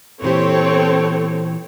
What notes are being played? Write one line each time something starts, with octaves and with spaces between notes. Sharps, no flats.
A#2 E3 C4 G4 A4 C#5